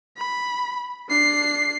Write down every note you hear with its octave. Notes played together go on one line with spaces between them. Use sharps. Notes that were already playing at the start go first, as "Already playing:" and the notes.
B5
D4 C7